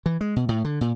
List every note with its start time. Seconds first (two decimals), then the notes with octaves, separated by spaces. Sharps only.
0.06 E3
0.21 G#3
0.36 B2
0.49 A2
0.65 D3
0.81 A#2